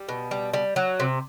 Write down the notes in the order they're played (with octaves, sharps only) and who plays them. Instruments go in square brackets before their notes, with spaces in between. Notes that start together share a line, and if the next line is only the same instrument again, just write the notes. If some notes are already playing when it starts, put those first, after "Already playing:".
Already playing: [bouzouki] G3
B2
G3
G3
F#3
C3